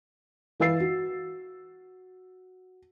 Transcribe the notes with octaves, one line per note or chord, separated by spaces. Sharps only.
E3 B4 F5 E6 A6 C7
F#4